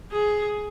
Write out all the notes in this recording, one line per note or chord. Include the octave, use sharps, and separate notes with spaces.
G#4